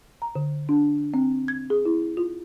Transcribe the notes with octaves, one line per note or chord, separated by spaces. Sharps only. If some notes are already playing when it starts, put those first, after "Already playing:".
A#5
D3
D4
C4
G#6
G#4
E4
F4